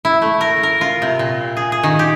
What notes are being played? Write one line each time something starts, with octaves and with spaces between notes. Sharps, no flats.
E4
A3
A#4
A#4
F4
C3
A#2
G#4
G#4
D#3
G4